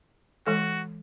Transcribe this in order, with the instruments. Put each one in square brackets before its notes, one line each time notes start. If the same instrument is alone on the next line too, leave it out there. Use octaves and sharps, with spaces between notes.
[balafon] E3 G#3 A4 [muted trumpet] F#4